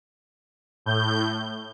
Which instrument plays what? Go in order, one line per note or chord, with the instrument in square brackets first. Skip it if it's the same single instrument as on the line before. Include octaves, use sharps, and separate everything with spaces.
[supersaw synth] A2 G6